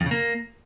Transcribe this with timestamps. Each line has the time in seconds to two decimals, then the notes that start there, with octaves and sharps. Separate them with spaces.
0.01 F2
0.06 C#3
0.11 A#3